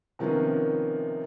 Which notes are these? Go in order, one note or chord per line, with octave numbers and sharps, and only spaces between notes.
C3 D#3 F3 A#3 B3 C#4